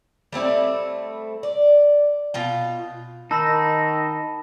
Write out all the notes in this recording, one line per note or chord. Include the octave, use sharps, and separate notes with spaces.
G3 A3 C4 E4
D5
B2 F4 G5
D#3 D#4 A5 B5 E6 A#6